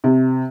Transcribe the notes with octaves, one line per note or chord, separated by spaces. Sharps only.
C3